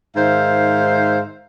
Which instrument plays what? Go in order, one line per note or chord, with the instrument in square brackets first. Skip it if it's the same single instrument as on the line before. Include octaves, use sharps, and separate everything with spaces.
[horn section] G#2 D#3 C5 E5 F5